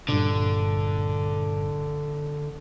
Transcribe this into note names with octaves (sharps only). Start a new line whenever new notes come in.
G2 A#2 D3